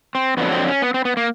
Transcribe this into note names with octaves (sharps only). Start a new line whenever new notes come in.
C4
F2 D3 F#3 B3
C4
C#4
B3
C4
B3
A#3